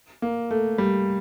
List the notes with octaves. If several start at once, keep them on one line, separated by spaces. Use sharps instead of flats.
A#3
A3
G3